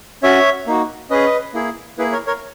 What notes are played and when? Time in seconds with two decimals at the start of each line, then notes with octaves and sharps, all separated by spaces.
0.23 C#4 F#4 C#5 E5
0.67 A#3 D#4 F#4
1.10 C#4 G#4 B4 D#5
1.54 A#3 E4 G#4
1.98 A#3 E4 G#4 B4
2.12 A#4 C#5
2.27 A#4 C#5